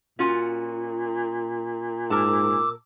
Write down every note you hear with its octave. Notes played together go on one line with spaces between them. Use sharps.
A#2 C#4 F4 F#4
G#2 A#4 A5 D6 E6